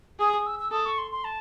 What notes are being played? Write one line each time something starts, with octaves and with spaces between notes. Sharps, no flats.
G#4 D#6
D#6
E6
E6
A4 D#6
C#6
C6
C6
A5